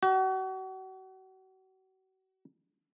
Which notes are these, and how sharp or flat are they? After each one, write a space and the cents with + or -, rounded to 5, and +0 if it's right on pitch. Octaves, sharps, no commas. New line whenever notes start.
F#4 +35